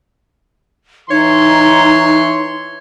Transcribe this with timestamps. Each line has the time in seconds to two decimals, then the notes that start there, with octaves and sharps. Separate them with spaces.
1.10 E3 D#4 C#5 C6